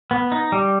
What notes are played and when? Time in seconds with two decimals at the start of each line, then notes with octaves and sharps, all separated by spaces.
0.11 B3
0.32 D#4
0.52 G3